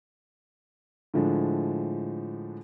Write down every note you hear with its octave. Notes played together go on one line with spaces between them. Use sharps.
A2 D3 F3 G#3 D4